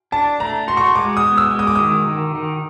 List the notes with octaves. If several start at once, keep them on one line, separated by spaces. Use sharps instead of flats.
D4 A5
A3 A#5
F#4 C6
C#6
C6
G#3 D6
D#6
B3
E6
G#3
D#6
D6
D#3 D#6
D#3
D#3